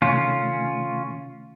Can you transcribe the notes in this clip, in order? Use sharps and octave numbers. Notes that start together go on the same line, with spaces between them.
C3 D#3 A3 C#4 F4